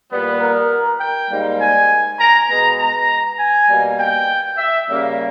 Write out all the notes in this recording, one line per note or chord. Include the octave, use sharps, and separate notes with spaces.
A#2 G3 B3
A#4
G5
G#2 G3 A#3
G#5
A#5
B2 G#3 B3 A#5
A#5
G#5
B2 G3 A#3
G5
E5
C#3 G3 A#3